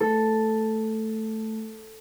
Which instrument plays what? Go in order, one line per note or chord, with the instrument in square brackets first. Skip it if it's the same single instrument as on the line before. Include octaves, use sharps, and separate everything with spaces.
[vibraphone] A3 [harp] A4